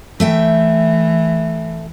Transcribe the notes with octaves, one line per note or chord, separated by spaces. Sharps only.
E3 A3 E5 G5